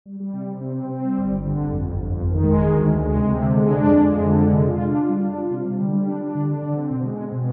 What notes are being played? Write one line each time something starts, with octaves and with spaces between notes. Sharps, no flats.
G3
G3
C3
C3
C4
C4
C4
G3
G1
G1
D3
G1
F2
G1
F2
G1
D#3
G#3
D#3
D2
D2
G#3
C3
C3
D3
G#3
D4
F2
G#3
F2
D3
G#3
C3
F4
D4
F4
G3
D4
F4
C3
G3
D3
G3
D4
D4
D3
D4
D3
C4
B2
G#3
C4
B2